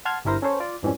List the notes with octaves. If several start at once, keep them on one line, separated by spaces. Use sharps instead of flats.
F#5 A5 C6 F6 G#6
G1 G2 E4 A#4 C5 A#6
C#4 A4 A#4 C5 C#5
F4 D5
F2 G#2 E3 F3 G3 C#4